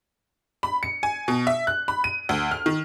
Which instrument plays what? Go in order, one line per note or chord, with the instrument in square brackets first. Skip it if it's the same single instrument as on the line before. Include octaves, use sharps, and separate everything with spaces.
[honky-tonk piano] B5
C#7
G#5
B2
E5
F#6
B5
D#7
D2
F6
D#3